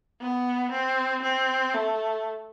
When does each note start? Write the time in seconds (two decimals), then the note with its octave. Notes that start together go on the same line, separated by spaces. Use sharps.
0.21 B3
0.71 C4
1.23 C4
1.74 A3